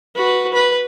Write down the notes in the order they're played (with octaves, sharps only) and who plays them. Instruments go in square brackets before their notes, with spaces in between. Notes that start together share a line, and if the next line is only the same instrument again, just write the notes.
[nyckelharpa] F#4 B4
B4